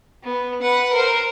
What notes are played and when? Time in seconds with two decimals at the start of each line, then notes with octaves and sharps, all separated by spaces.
0.24 B3
0.62 B4 F#5
0.93 A#4 C5